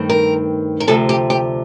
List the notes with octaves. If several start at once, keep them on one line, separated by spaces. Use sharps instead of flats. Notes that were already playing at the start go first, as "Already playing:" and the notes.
Already playing: G2 D#3 A3 C4
A#4
A#4
D2 C3 F3 A4
G4
G4